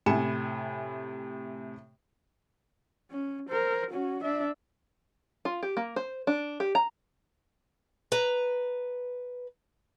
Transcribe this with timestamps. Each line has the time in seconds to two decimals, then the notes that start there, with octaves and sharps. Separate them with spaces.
0.06 A2 C3 G#5 B5 C#7 E7
3.11 C#4
3.49 A#4 C5
3.90 C#4 F#4
4.23 D4 E5
5.45 F4
5.63 G4
5.77 A#3
5.96 C5
6.27 D4
6.60 G4
6.75 A#5
8.12 B4 A#5